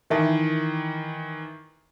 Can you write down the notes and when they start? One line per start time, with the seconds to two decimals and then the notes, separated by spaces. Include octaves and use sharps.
0.10 D#3 E3 A#4 E5 A5